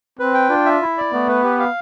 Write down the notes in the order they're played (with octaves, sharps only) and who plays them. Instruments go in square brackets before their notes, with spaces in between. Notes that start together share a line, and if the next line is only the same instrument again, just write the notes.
[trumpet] C4 [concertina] B4
[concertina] G5
[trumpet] D4 [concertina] F4
[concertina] E5
E4
D5
[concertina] A3 [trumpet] B3
[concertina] B4
G4
F5